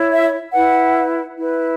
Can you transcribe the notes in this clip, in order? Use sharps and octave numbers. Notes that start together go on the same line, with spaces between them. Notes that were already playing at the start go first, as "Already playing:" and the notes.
Already playing: E4 C#5
E5
E4 B4 F#5
E4 B4